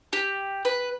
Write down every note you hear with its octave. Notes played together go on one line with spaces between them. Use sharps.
G4
B4